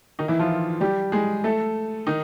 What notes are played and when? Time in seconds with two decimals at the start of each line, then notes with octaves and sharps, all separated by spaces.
0.19 D#3 D#4
0.28 E3 E4
0.39 F3 F4
0.81 G3 G4
1.12 G#3 G#4
1.44 A3 A4
2.07 D#3 D#4